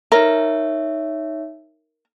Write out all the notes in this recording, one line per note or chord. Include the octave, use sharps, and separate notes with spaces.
D#4 A#4 C#5 E5